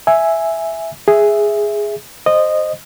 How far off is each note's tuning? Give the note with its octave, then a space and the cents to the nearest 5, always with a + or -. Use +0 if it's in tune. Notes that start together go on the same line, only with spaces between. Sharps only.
E5 +0 G#5 +0
G#4 +0 E5 +0
C5 +0 D#5 -15